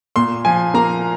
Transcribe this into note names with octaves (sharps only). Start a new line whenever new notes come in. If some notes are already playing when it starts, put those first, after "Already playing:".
A#2 C6
F3 G#5
A#3 A#5